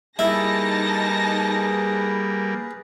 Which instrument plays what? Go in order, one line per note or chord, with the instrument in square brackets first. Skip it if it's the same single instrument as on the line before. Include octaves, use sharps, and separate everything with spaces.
[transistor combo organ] G3 A#3 [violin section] D#4 A5 A#6 [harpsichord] E4 [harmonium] G#4 B4